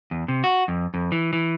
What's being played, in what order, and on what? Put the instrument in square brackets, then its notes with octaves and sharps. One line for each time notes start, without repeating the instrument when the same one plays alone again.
[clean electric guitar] E2
C3
F#4
F2
F2
E3
E3